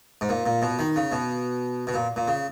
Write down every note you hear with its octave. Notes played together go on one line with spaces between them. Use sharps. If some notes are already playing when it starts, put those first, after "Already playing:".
G#2
A#2
A#2
B2
D#3
C#3
B2
B2
A#2
A#2
C#3